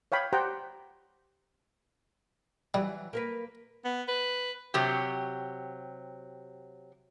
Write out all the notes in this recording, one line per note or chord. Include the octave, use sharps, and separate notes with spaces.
C#5 F5 G5 B5
G4 C5 F#5 G5 A#5
E3 F#3 G3
A#3 A#4 B4
B3
B4
C3 F#3 G4